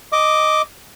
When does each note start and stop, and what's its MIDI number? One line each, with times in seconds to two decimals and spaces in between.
0.13 0.62 75
0.13 0.62 86